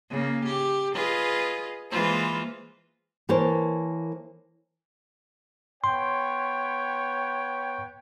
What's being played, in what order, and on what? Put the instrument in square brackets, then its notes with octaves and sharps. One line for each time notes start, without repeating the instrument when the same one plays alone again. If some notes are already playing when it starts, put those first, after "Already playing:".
[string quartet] C#3 A#3
G4
F4 G#4 B4 D#5
E3 G#3 A#3 F4 B4 C5
[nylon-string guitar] E3 A#3 A#4 C5 C#5 A5
[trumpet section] B3 C#5 G5 [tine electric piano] C6